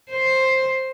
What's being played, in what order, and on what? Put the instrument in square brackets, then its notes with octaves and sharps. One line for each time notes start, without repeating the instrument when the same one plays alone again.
[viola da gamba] C5